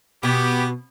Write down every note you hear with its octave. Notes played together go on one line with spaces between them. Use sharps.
B2 B3 G4